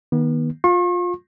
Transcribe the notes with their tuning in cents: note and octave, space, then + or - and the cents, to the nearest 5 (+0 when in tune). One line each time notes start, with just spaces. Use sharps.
D#3 +0 B3 -35
F4 +20 C#6 -45